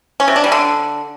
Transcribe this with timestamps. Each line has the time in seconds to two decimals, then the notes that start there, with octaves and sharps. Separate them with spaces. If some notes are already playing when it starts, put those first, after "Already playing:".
0.20 C#4
0.28 C3
0.36 D4
0.44 G3
0.52 D3